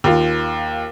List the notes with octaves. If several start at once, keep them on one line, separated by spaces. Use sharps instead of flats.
D#2 F4